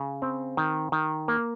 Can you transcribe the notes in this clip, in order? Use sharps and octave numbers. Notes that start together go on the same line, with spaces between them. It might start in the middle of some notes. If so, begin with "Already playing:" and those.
Already playing: C#3
C4
D#3
D#3
A#3